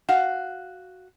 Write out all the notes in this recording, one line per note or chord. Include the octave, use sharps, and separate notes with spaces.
F#4 F5 F#5